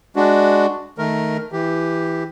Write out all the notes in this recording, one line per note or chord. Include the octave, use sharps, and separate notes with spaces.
G#3 D4 F#4
D#3 A3 A#4
E3 G4